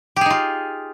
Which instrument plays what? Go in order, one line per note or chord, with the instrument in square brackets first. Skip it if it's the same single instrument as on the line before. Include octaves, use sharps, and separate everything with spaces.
[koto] G4
G#4
D#4
F4